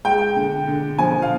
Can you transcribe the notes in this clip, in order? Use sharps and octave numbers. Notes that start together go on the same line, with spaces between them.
G#3 G5
D3
D3
F3 G#5
F5